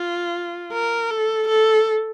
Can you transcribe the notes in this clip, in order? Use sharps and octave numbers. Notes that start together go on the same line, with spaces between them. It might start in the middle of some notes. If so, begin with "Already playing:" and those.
Already playing: F4
A#4
A4
A4